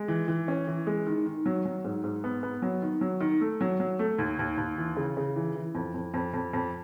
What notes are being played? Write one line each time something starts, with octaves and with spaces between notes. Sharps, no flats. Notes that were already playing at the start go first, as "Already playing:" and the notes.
Already playing: G#3
E3
E3
C#4
E3
G#3
D#3
D#3
F#3
F#3
G#2
G#2
B3
B3
F#3
D#3
F#3
D#3
A3
F#3
F#3
A3
D#2
D#2
D#2
E3
C#3
C#3
E3
E3
F2
F2
F2
F2
F2